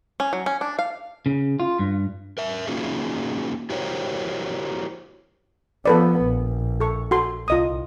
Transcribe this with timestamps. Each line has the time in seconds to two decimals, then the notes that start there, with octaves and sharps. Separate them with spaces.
0.20 C#4
0.33 F#3
0.46 C#4
0.61 D4
0.79 F5
1.26 C#3
1.60 F4
1.79 G2
2.38 A#4 E5
2.68 A#3 C#4 D#4 F4 F#4 G#4
3.70 E4 F#4 G4 A#4 C5 C#5
5.86 F3 B3 A4 B4 D5
6.22 A#1
6.80 A4 C#6
7.11 F#4 A4 C6
7.48 C2 F4 D#5 D#6